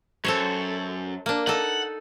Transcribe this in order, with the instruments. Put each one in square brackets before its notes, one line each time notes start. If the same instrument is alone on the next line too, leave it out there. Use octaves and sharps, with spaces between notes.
[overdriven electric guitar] F#2 [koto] A4 C5 C#5
[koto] A#3 D4
[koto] D#4 A4 [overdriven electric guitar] F#5